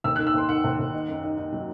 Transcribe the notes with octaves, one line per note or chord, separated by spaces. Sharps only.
D#2 E6
D#3 F#6
E6
D#2 C6
D#3 F#5
D#2
D#2
D#4
F#2
D#4
D#4
F#3